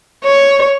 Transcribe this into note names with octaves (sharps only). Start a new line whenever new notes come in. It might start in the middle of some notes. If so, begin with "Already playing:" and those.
C#5